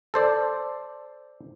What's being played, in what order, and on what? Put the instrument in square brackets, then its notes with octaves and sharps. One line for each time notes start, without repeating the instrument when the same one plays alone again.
[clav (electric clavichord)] A4 C5 D5